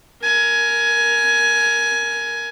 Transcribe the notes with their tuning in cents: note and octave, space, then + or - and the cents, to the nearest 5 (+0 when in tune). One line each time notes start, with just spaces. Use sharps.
A#4 +0 G#5 +15